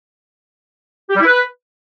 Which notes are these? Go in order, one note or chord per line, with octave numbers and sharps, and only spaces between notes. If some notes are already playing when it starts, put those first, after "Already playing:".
G4
G3
E4
B4